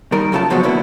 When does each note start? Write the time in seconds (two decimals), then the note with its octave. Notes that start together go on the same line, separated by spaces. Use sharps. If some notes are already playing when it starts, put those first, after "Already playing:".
0.12 D#3 G3 A#4
0.32 F#2 C#3 A3 F4 A5
0.50 B2 F3 F#3 G#3 B3 F#4
0.63 E2 B2 D3 A#3 B3 E4